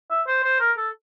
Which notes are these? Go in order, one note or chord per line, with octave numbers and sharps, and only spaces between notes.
E5
C5
C5
A#4
A4